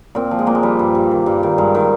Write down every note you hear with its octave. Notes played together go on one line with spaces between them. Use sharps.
A#2 C4
F3
G#3
A#2 A#3
G#3
F3 G3
G2
G2
D#3
G2
D#3
G2 G#3
D#3